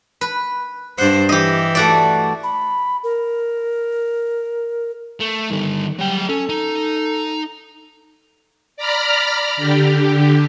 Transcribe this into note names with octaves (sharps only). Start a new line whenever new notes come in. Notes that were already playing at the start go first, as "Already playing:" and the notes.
B4
G2 D4 C5 F#5
E3 G4 D#5
A3 F#4 D5
B5
A#4
A3
G2 D3 D#3
F#3 G3 G5
C#4 A4
D#4
D5 A#5 B5 F6
D3 G4